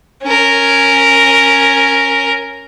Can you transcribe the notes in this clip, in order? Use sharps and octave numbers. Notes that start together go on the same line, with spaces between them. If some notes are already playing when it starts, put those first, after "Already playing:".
C#4 A#4